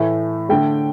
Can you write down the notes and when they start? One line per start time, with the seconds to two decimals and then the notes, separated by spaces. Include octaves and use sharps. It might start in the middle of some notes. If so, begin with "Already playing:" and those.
Already playing: A2 E3 A3
0.49 D3 A3 G5